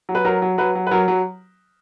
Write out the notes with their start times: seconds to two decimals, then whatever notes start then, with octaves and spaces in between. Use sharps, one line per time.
0.09 F#3
0.15 B4
0.25 F#3 A#4
0.42 F#3
0.58 F#3 B4
0.75 F#3
0.87 B4
0.91 F#3 A#4
1.08 F#3